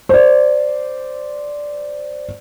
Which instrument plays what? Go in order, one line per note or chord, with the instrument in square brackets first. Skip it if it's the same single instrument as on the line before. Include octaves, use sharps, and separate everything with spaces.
[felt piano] C5 D5